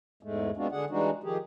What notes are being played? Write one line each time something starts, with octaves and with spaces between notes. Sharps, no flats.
E2 G#2 G#3 A3
G#3 B3 C4 D4 F4 F#4
D3 D4 G#4 F#5
E3 G3 G#3 D4 D#4 F#4
D#3 F3 G4 G#4